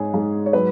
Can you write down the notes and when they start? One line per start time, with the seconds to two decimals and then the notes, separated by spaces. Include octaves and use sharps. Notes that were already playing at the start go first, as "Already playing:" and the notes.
Already playing: G#2 G#3 G#4 C#5
0.14 G#2
0.46 C#5
0.53 F#3 B4